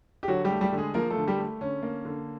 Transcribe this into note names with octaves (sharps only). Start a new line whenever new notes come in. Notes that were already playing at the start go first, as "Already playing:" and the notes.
G4
D3 F#3 F#4
G3 G4
A3
G3 G4
D3
G#3 G#4
F3 A#3 A#4
A3 A4
D3
G3 G4
A3
D3 C#4
A#3
D3